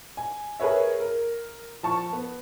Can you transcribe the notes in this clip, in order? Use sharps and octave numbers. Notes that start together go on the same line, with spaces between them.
G#5
G#4 A#4 B4 C#5 E5
A#4
F3 A5 C#6
B3